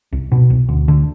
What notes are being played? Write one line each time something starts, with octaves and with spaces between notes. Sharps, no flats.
C2
B2
C2
D2
D3